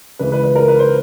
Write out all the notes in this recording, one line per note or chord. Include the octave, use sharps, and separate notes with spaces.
C#2 C#3 E3 B4
B4
B4
A#4
B4
C5